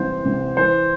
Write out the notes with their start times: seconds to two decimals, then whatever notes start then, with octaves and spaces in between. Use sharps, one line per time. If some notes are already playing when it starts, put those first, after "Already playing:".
Already playing: C2 C3 E3 C5
0.25 C3
0.57 E3 C5